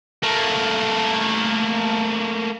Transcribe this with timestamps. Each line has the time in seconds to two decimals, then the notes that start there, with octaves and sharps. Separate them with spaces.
0.23 A3 A#3